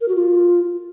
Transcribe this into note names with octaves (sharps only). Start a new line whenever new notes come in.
A#4
F#4
F4